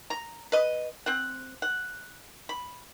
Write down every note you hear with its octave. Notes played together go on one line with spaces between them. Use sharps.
A#5
B4 D#5
C4 F#5
F#5
B5